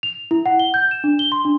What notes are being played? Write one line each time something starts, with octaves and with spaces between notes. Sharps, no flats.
F7
E4
F#5
G7
G6
E7
D4
G7
C6
D4